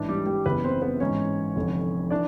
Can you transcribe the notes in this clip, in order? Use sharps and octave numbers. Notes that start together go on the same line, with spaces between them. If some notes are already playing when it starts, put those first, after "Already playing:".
Already playing: A1 G#2 E3 D4
G3 G4
G3 G4
F#1 F#2 C#3 E3 B3 B4
C4 C5
B3 B4
A1 G#2 E3 C#4 C#5
F1 F2 D3
E3 D4 D5